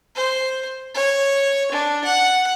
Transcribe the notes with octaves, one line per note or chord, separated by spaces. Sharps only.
C5
C#5
D4
F#5